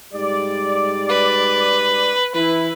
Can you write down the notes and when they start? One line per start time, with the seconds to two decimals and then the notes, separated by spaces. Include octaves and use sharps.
0.13 G#2 G3 D5
1.09 B4
2.35 E3 E4 B4